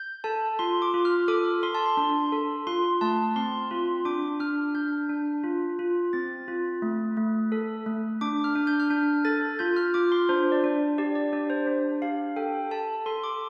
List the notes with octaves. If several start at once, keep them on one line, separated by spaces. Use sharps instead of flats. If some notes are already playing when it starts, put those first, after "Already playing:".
Already playing: G6
A4 A5
F4 C6
D6
F4
F6
A4 D6
A4 C6
A5
C6
D4
A4
F4 C6
A3 A5
C4 C6
F4
D4 D6
D4 F6
D4 G6
D4
F4
F4
C4 A6
F4
A3
A3
A4
A3
D4 D6
F6
D4
G6
F6
D4 G6
A4 A6
F4 G6
F6
F4 D6
C6
D4 C5
D5
D4
G4 D5
D5
D4 D5
C5
D4
G4 F5
A4 G5
A4 A5
A4 C6
D6